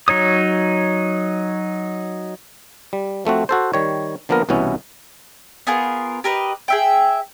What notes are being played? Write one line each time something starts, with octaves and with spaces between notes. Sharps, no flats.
F#3 D#4 C#5 D#6
G3
F3 A3 C4 F#4
F#4 A4 C5
D#3 G3 C#5
D3 F3 A#3 B3 A#4
C2 B2 E3 B3 C#4 E4
B3 F4 G#4 A#4
G4 A#4 B4 D#5
G#4 E5 G5